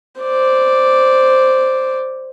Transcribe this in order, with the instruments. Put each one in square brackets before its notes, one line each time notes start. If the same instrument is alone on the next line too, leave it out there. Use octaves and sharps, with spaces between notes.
[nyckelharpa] C5 D5